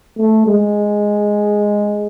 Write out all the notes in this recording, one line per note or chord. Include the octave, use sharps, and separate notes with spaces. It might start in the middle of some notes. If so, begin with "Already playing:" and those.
A3
G#3